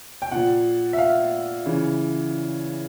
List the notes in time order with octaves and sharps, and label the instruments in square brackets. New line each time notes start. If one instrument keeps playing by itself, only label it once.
[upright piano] G5
A#2 F3 F#5
E5
F5
C#3 E3